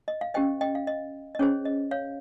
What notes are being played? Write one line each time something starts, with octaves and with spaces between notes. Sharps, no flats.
D#5
F5
C#4 G4 C5 D#5 G5
D#5 G5
F5
D#5
D#5
C#4 G#4 C5 C#5
D#5
C#5 F5